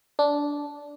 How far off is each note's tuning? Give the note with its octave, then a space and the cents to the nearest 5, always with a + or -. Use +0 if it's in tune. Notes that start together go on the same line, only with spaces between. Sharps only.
D4 -10